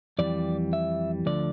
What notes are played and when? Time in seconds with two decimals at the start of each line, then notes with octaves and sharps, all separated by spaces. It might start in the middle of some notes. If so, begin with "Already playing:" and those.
0.19 F2 E3 G3 D5
0.73 E5
1.26 D2 D3 F3 D5